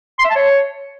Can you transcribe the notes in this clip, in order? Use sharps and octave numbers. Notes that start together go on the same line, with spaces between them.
C6
E5
A5
C#5